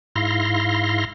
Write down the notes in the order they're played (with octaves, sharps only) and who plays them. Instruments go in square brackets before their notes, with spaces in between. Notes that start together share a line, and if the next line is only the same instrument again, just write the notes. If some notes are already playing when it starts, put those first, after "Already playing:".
[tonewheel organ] G#2 E4 F5 C6 A#6